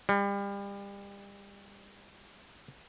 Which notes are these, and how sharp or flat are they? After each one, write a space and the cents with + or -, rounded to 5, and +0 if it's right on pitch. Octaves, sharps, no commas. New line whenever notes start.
G3 +35